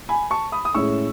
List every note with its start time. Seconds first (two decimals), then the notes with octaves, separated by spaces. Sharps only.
0.09 G#5 B5
0.31 A5 C#6
0.52 B5 D#6
0.65 D#6
0.74 A2 G#3 C#4 E4 C#6 E6